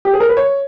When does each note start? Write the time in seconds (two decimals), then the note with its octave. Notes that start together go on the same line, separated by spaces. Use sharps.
0.05 G4
0.13 G#4
0.20 A#4
0.29 B4
0.37 C#5